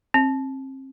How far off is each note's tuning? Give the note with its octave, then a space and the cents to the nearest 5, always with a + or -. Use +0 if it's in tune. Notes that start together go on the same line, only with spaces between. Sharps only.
C4 +35